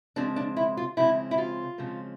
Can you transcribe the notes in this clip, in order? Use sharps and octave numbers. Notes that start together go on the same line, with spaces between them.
C#3 F3 G#3 C4 D4
D4
E4
F4
C#3 F3 G#3 C4 E4
E4
F4
C#3 F3 G#3 C4